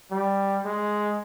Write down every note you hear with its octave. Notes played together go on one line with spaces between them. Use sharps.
G3
G#3